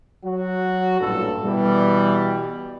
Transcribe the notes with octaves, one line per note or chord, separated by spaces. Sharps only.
F#3 F#4
A1 G2 A#2 G3 A4
B2 E3 G3